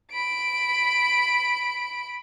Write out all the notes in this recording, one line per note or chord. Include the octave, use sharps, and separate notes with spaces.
B5 D7